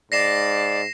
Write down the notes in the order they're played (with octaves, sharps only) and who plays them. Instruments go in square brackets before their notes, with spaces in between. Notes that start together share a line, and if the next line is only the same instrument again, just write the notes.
[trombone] G#2 [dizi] D5 [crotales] A#6 C7 E7